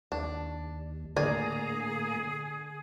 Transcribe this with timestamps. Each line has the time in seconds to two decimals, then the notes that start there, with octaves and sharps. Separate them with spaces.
0.12 D#2 D4
1.16 A2 D3 A#3 G#4 D5 G#5 A#5